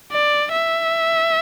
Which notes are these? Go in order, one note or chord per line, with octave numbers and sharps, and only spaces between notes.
D5
E5